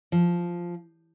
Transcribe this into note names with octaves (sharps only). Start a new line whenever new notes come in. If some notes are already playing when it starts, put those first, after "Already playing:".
F3